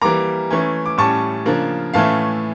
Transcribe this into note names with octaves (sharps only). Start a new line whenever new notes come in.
E3 G3 A#3 A#5 D6
E3 A3 C#4
D6
A2 G3 C#4 A5 C#6
C#3 F3 A#3 D4
A2 E3 A3 C#4 F5 A5